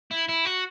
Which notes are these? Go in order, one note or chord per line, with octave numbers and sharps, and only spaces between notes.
E4
E4
F#4